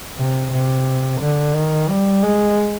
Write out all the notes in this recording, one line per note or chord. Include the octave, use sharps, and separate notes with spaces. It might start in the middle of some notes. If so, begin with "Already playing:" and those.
C3
C3
D3
D#3
G3
G#3